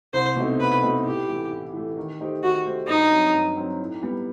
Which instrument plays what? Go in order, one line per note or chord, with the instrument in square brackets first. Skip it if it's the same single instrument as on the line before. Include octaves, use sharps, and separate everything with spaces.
[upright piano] C2 [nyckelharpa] C5
[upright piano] B2 A3 C4 D#4
[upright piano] C2 [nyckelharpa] B4
[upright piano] B2 A3 C4 D#4
[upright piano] A2 [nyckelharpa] G4
[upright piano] E3 A3
A2
E3 A3
D#3
A3 D#4 G4 C5
[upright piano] D#3 [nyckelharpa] F#4
[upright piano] A3 D#4 G4 C5
[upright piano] G2 [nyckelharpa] D#4
[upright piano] F#3 C4
G2
F#3 C4
A2
G3 B3